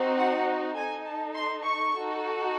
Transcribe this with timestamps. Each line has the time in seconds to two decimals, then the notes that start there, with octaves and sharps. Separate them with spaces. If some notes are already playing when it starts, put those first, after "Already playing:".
Already playing: C4 D#4 F#4
0.17 F#5
0.75 D#4 A4 G#5
1.05 A5
1.35 C6
1.64 C#6
1.94 D#4 F#4 A4